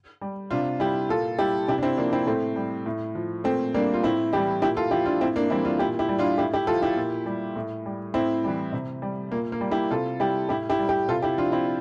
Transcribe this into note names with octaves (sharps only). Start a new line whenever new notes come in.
G3
C3 D4 F4
G3 E4 G4
A#2 F4 A4
G3 E4 G4
C3 E4 G4
D4
C4 E4
F3 A#3 D4
C4 E4
A2 A3 C4
G3
A2
F3
A#2 A3 C4
G3 A#3 D4
F4
A2 C4 E4
E3 G3 E4 G4
A#2 E4 G4
F4 A4
F3 E4 G4
D4 F4
A2 C4 E4
A#3 D4
E3 G3 C4 E4
D4 F4
A#2 E4 G4
E4 G4
G3
D4 F4
A2 E4 G4
E4 G4
F3 F4 A4
E4 G4
A#2
G3
A2
G3
A2 C4 E4
E3 G3
C3
G3
A#2 A#3
A#3
G3
E4 G4
C3 F4 A4
G3 E4 G4
A2 E4 G4
E4 G4
G3
E4 G4
C3 F4 A4
E4 G4
F3 D4 F4
C4 E4